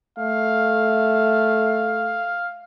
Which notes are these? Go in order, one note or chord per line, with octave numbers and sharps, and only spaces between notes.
A3 F5